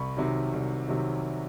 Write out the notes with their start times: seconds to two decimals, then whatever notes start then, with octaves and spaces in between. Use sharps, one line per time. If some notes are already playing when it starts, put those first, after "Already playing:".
Already playing: C2 B5 C#6
0.17 C3 D#3 F#3
0.53 C2
0.88 C3 D#3 F#3